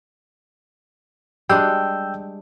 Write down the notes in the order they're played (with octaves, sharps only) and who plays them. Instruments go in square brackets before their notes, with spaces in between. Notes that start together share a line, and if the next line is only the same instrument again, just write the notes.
[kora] G3 G#3 D4 [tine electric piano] G5 E6 G6